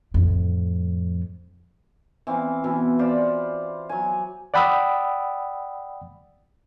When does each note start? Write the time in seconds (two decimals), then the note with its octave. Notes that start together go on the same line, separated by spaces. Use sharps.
0.14 F2 A2
2.27 E3 C4 F5
2.64 B2 E3
2.99 F4 C5 D5 B5
3.89 F#3 G#5
4.54 D5 F#5 G5 B5 D#6 E6